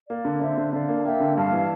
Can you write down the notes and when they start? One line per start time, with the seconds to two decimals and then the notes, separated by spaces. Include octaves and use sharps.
0.09 A#3 A#4 D5
0.25 D3
0.41 D3 C5 E5
0.58 D3
0.73 D3 D5 F5
0.89 A#3
0.97 A5
1.04 A#3 E5 G5
1.20 D3
1.37 G2 F5 A5
1.52 E3